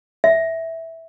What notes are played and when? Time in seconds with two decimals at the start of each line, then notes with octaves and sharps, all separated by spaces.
0.24 E5